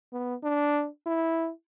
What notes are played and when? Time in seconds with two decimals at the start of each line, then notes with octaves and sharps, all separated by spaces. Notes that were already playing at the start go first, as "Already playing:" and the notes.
0.13 B3
0.44 D4
1.07 E4